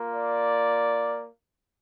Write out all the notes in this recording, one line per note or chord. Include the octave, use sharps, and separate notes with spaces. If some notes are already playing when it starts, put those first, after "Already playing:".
Already playing: A#3 F4
D5